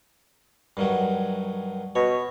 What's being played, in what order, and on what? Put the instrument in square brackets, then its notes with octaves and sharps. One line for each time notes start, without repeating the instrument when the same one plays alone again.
[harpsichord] G2 D#3 F#3
[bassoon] B2 [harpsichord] C#5